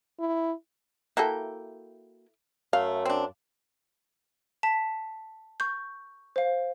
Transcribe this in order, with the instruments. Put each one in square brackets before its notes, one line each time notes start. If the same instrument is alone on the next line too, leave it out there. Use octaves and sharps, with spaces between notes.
[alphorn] E4
[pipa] A#3 F#4 G5 [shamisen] E4 A4
[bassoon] F#2 [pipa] A3 [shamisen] F5
[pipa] C4 D4
[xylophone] A5 B6
C#6 G6
C5 F5